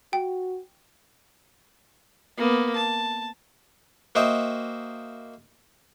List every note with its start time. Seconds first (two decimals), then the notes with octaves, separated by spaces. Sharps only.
0.13 F#4 G5
2.37 A#3 B3
2.76 A5
4.15 A#3 F#4 C5 D#5 E5 G5